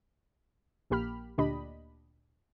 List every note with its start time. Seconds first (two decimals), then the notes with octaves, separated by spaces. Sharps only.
0.90 A#1 A#3 G4 B5 F6
1.38 D2 A#2 D4 G4 D#5 B5